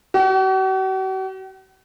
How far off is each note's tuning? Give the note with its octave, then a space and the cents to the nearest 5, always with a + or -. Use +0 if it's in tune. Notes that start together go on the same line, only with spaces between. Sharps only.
F#4 +45